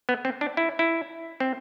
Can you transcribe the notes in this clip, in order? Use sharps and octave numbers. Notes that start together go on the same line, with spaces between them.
B3
C4
D4
E4
E4
C4